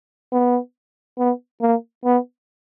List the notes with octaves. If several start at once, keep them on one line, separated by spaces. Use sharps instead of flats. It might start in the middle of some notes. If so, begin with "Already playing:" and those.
B3
B3
A#3
B3